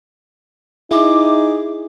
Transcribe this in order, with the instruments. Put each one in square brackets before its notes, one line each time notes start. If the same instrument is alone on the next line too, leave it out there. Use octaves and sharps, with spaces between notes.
[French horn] D#4 [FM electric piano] E4 [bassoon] G#4 [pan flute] D6